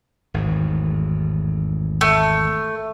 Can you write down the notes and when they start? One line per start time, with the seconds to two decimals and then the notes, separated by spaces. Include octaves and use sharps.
0.34 G#1 E2 A2
2.01 A3